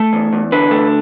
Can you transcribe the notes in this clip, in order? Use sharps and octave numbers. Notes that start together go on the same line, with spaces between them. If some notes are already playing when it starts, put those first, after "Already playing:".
Already playing: A3
E2
E2
D3 B4
A3